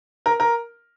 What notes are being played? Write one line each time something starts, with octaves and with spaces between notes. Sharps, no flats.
A#4
A#4